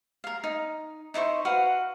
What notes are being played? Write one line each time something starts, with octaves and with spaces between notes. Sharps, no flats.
A#4 F5
D#4
D#4 E4 C5 C#6
F#4 B4 F5 F#5